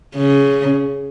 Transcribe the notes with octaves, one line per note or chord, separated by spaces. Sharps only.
C#3